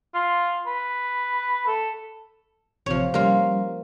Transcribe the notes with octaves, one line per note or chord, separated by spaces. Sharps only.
F4
B4
A4
A1 C3 F3 C#5
G3 A#3 C#4 F4